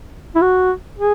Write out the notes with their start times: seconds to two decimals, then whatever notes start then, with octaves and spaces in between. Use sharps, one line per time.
0.35 E4
0.42 F#4
0.98 G#4